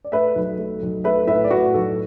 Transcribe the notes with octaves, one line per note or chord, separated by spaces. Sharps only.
D5
A3 B4 E5
B1
A3
B1
A3 B4 E5
A2 B4 E5
D5
A2 F#4 B4
B1 A4